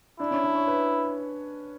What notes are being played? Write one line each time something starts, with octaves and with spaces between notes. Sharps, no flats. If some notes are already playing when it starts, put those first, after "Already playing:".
D4 E4
C#4
D4
C#5
B4